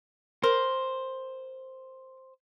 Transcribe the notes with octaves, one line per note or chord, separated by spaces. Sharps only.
A#4 C5